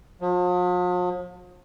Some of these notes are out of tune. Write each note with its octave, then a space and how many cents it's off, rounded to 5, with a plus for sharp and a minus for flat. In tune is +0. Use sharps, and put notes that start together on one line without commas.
F3 +45